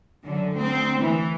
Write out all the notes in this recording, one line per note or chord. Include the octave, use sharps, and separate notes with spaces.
F#2 D3
D2 C4
E3